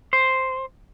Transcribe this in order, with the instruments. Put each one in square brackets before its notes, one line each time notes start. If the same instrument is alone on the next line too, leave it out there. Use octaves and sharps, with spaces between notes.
[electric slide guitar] C5